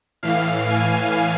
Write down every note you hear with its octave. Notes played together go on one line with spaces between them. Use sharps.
A2 E3 F5
G#5